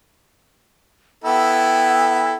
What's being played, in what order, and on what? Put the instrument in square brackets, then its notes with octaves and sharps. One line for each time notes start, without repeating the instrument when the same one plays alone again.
[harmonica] B3 E4 A4 [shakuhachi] G5